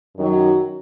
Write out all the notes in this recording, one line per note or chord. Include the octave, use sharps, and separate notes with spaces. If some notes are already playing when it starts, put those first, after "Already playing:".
F#2 D#3 F#3 D#4